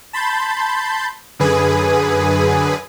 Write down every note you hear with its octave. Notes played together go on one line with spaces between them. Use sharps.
A5 B5 C6 G6 A6
F#2 D3 G#4 B4 G#5 D#6